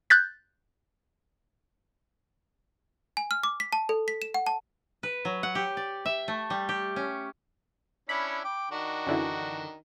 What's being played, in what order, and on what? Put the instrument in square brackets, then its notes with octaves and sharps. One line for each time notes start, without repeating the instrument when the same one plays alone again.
[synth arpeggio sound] F#6 G6 A6 B6
[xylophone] G#5
F6
D6
B6
A5
A4
B6
E7
F#5
A5
[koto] B4
F#3
F#5
G4
D5
E5
A3
G3
G4
C#4
[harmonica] C#4 D4 E4 [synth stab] B5
[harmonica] G5 D6
D#3 D4 F#4
[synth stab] F#2 D3 E3